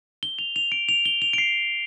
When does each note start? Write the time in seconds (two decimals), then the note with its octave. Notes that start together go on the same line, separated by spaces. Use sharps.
0.23 G7
0.39 F7
0.56 F7
0.72 D7
0.89 F7
1.06 G7
1.22 F7
1.33 D7
1.38 C7